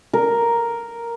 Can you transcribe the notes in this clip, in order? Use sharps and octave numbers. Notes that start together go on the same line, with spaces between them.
A#4